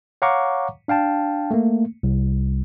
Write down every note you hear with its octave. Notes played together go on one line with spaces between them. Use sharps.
C#5 F5 F#5 A#5 C#6 D6
D4 F5 G5 A5
A3 A#3
C2